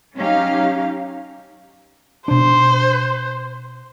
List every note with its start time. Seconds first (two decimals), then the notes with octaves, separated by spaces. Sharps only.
0.16 F#3 C#4 D#4 G4 F5
2.28 B2 D4 C5